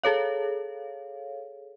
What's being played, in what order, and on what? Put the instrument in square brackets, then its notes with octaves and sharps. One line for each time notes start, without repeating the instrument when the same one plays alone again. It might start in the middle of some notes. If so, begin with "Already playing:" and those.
[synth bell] G#4 A4 C#5 F5